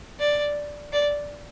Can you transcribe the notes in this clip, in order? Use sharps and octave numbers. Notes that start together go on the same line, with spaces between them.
D5
D5